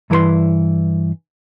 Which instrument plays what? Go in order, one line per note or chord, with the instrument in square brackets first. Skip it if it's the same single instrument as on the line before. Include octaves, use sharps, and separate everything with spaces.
[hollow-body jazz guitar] G2 E3 E4 A#4 B4 C6